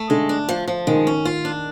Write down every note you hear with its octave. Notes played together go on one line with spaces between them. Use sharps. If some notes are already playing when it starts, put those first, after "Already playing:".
Already playing: A3
D3 G#3
D4
F3
F3
D#3 G#3
C#4
F4
D4